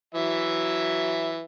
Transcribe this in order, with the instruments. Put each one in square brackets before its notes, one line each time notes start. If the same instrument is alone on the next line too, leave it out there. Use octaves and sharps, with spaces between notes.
[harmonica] E3 F#3 E5